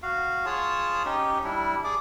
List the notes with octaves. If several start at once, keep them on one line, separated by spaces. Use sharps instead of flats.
F#4 F5
F4 G#4 C#5 A5
C#4 D#4 G4
G3 D4 E4
G#4 D5 D6